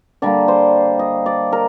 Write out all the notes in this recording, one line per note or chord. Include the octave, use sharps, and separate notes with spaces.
D3 G3 A#3 D5
C5
D#5
D5
A#4